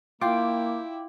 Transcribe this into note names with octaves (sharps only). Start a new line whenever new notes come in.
A#3 E4 F4 G5 D6